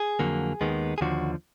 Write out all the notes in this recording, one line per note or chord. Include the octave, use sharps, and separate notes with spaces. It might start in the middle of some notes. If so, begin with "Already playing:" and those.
Already playing: G#4
F2 D3 F#3 A#3
D#2 D#3 G#3 B3
G#4
D#2 D3 F3 F#4